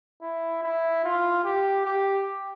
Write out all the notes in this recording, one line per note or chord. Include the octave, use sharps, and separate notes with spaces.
E4
E4
F4
G4
G4